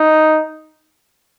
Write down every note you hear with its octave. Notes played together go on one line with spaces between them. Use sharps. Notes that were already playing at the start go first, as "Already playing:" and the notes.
Already playing: D#4